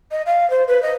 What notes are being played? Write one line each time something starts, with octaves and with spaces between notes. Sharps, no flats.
D#5
F5
C5
B4
D#5